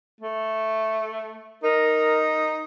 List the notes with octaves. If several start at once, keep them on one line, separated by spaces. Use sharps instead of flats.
A3
D#4 A#4